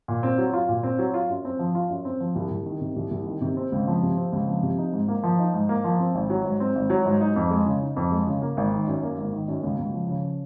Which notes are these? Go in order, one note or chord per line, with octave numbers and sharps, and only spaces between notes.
A#2
C4
F#3
F4
A#2
C4
F#3
F4
F#2
C4
F3
F4
F#2
C4
F3
C2
C2
D#3
C3
C2
C2
D#3
C3
C4
C#2
F3
C3
C4
C#2
F3
C3
D#4
G#2
A#3
F3
D#4
G#2
A#3
F3
C4
G#1
F#3
G#2
C4
G#1
F#3
G#2
D#4
F2
G#3
C#3
D#4
F2
G#3
C#3
A#3
G#1
D#3
F#2
A#3
G#1
D#3
F#2
C#2
C#2
F3
C#3